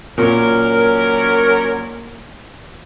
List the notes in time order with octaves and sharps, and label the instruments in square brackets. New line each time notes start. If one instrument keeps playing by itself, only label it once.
[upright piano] A#2 [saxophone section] F#3 C#4 A#4